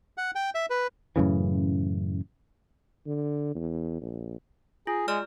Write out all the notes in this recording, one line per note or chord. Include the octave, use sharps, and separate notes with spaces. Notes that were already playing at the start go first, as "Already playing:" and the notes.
F#5
G5
E5
B4
F#2 A2 C#3 E3
D3
E2
A#1
F4 G#4
G#3 G#4 D5 F6